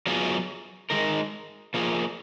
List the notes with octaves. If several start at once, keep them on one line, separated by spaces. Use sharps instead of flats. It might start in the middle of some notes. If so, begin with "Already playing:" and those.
F#3 B3 F4 G#4
D#3 G#3 D#4 A#4
F3 A#3 F4 G#4